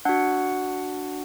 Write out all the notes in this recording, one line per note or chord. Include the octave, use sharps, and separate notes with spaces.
D4 F#4 F#5